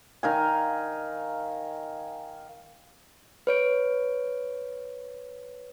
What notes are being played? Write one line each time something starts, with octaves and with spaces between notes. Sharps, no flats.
D#3 F5 G#5
B4 C#5 D7